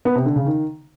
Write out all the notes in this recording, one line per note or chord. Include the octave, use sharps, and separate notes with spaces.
B3
C3
D3
C#3
D#3